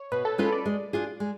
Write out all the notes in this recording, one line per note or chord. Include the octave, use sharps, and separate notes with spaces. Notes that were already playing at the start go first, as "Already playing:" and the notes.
Already playing: C#5
B2 B4
A4
G#3 C#4 F4 B4
D5
G#3
D4 F4 G#4
G#3